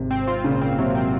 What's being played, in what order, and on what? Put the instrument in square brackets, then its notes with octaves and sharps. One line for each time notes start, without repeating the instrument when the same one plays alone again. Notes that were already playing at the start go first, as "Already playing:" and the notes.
Already playing: [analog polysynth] G#1 [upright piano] C3
[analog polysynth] C4
F4
[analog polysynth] A#2 [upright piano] C#3
[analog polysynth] C4
[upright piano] C3 [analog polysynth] F#3
[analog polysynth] C4